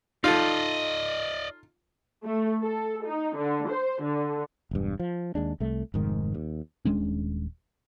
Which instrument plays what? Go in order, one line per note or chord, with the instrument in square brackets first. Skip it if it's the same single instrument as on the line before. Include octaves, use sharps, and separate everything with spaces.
[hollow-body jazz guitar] D#4 A4 [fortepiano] F4 [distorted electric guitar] D5 D#5
[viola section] A3
A4
D#4
D3
C5
D3
[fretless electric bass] E1 G2
F3
D#2 G#3 D4
C2 A3
F1 G#2 D#3
D#2
D#1 G#3 C#4 D4